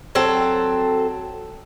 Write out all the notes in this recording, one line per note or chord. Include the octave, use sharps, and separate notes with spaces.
F#3 C4 A4